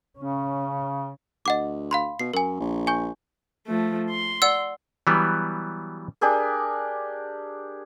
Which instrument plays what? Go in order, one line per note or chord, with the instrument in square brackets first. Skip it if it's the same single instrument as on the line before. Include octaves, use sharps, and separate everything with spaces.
[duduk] C#3 [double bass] C#4
[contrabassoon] D2 [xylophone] D#5 F#5 D6
[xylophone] F5 B5 C6
[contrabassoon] B2 [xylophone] C7
[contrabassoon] F#2 [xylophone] A#4 G#5
[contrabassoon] A#1
[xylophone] G#5 C#6 G6
[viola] F3 A3
C6
[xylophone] D5 F#5 E6
[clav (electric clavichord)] E3 F#3 G3 B3
[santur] D4 G4 G#4 A#4